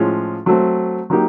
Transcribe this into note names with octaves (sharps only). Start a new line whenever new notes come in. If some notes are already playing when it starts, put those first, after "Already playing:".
Already playing: A2 F3 G#3 C#4 F4
F#3 A3 C4
F#3 A#3 D#4 G4